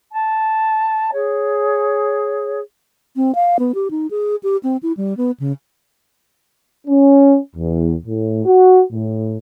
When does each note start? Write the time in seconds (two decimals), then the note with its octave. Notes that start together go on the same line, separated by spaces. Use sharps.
0.11 A5
1.13 G#4 C#5
3.16 C4
3.35 F5
3.59 B3
3.75 G4
3.91 D#4
4.11 G#4
4.43 G4
4.63 C4
4.83 E4
4.97 G3
5.17 B3
5.40 C#3
6.87 C#4
7.55 E2
8.05 A2
8.45 F#4
8.92 A2